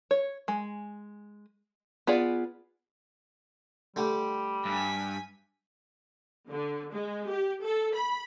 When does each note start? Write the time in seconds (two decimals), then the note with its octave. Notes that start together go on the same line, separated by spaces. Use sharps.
0.11 C#5
0.48 G#3
2.07 B3 F4 G#4 D5
3.96 D3 G3 A3 G4
4.65 G2 G#5 B6
6.50 D3
6.93 G#3
7.28 G4
7.63 A4
7.94 B5